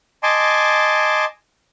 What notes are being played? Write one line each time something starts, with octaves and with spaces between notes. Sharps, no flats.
D#5 G#5 A5 C6 D6